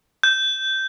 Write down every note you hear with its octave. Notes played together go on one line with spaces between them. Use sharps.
G6